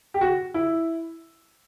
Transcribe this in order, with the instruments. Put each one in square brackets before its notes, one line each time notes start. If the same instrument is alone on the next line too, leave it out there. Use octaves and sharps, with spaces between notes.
[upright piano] G4
F#4
E4